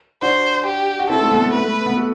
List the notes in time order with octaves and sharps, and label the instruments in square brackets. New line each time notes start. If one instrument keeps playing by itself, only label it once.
[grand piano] D4 F#4 [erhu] C5
[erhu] G4
[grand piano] F#4
[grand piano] C4 E4 [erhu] A4
[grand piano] A3 C4
B3
A3
[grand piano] A3 [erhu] B4
[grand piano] A3
B3
F#4 A4